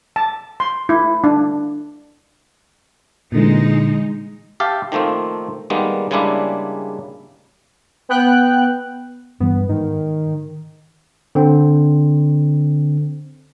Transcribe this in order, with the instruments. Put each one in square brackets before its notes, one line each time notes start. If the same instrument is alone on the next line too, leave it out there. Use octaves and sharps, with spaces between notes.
[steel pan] A5
C6
E4
D4
[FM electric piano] A#2 D3 E3 [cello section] G#3 D#4
[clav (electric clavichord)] G4 E5 F5 G5 A5
D#3 F3 A3 A#3 C4
D#3 G3 G#3 A#3 B3
C#3 G3 G#3 A#3 D4 E4
[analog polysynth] B3 G5 F#6
[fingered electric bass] G2 E3 [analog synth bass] B3
[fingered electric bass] G#2 [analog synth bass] D#3
[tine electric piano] D3 C4